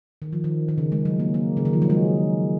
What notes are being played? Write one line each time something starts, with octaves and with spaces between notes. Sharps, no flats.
D#3
F3
D#3
D#3
C#3
G#3
F#3
A#3
A#3
C#3
D#3
F3
F#3
G#3